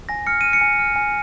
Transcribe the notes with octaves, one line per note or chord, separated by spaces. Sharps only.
G#5 A#6
F6 C#7
F6 D#7
C#7
G#5
F6
G#5